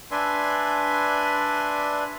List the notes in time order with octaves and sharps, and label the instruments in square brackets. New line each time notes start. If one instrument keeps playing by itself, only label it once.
[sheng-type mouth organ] D4 B4 D5 E5 G#5 C6